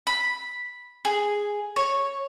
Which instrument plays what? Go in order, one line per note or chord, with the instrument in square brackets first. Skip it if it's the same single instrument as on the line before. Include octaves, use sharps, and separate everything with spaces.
[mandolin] B5
G#4
C#5